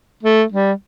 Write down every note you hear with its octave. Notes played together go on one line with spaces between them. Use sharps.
A3
G3